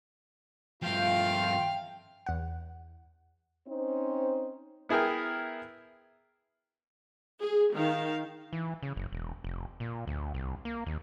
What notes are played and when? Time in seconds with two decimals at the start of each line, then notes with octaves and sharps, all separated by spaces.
0.83 G2 F3 A3 F4 F5 G5
2.26 E2 F#5
3.67 C4 C#4 D#4 C5
4.89 B3 E4 G#4 A#4 G5
7.40 G#4
7.73 D#3 F5
8.53 E3
8.83 C#3
8.96 F#1
9.13 E1
9.44 F1
9.80 A#2
10.07 D2
10.34 C2
10.65 A#3
10.86 D#2